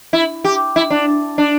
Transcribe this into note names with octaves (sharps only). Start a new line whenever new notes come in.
E4
G4
E4
D4
D4